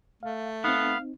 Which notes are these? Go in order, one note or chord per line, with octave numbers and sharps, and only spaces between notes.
A3 F5
B3 C4 D#4 F5